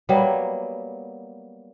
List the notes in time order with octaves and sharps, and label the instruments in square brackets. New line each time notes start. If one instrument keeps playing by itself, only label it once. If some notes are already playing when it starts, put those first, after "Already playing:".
[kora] F#3 G3 A#3 B3